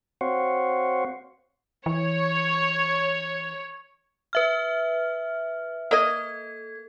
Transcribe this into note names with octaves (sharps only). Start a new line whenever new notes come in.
C4 F#4 C5 C#5 F5 F#5
E3 C#5
B4 E5 F6
A#3 A4 D#5 G#6